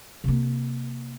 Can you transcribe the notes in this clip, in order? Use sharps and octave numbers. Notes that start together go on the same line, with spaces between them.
C3 A#3